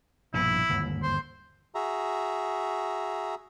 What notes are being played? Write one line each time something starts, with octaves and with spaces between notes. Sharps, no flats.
A#1 G2 B2 E4
G1 D#2 G#2
C5
F#4 G#4 E5 A#5